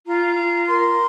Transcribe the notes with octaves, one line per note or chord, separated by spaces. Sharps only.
F4 A#5
F4
A#4 C6